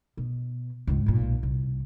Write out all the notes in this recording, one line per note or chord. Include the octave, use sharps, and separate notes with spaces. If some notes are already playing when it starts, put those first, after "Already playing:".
B2
C#2 G#2
B1 A#2
C2